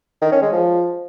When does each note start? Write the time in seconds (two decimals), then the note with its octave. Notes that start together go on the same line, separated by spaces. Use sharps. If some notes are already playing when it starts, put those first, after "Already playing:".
0.22 D#3
0.32 C#4
0.42 G#3
0.52 F3